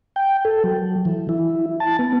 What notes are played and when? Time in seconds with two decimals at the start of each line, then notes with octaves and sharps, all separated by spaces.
0.16 G5
0.45 A4
0.64 F#3
1.05 E3
1.29 E4
1.80 A5
1.99 B3